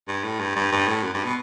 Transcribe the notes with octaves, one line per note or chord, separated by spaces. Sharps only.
G2
A2
G2
G2
G2
A2
F#2
G2
B2